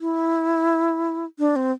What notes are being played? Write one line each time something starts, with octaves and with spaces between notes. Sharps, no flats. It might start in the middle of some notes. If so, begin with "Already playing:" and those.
E4
D4
C4